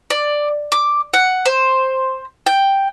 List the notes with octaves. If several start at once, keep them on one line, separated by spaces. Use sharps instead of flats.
D5
D6
F#5
C5
G5